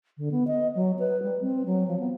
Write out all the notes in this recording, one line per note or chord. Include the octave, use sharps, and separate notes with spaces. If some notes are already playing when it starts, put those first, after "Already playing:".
D3
B3
D#5
F#3
B4
G3
C4
F#3
F3
B3